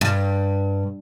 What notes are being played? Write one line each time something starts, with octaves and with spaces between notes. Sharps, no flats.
G2